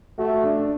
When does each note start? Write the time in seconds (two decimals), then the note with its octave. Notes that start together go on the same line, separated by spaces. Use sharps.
0.18 A3 F#4
0.44 D4